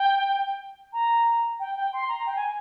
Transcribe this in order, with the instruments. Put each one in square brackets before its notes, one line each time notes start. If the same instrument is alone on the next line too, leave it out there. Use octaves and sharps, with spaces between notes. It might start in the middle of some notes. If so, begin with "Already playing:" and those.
Already playing: [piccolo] G5
A#5
G5
G5
C6
A#5
G5
G#5